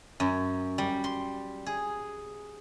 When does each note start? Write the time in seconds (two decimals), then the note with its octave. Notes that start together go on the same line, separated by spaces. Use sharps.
0.20 F#2
0.78 G3
1.04 C6
1.66 G#4